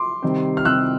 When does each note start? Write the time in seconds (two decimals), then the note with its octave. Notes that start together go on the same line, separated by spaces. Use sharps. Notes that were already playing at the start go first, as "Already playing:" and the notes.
Already playing: C6 D6
0.22 C3 D#3 G3 C4
0.57 F6
0.65 C3 D#3 G3 C4 E6 F#6